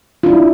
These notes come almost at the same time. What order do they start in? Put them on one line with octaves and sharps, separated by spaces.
F4 D4 E4